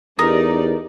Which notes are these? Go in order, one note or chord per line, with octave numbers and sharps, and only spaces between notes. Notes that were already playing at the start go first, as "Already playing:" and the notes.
E2 D#4 G4 A#4 D5 D#6